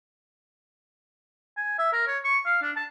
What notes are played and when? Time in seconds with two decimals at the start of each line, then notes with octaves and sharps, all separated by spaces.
1.57 G#5
1.78 E5
1.93 A#4
2.07 C#5
2.24 C#6
2.46 F5
2.62 D4
2.76 A5